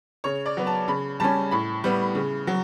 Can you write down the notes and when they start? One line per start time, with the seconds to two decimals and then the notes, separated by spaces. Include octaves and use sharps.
0.24 C#3 C#5
0.46 D5
0.57 F#3 B3
0.67 A5
0.88 C#3 B5
1.20 G3 C#4 A5
1.51 A2 B5
1.84 G3 B3
2.15 C#3
2.47 F#3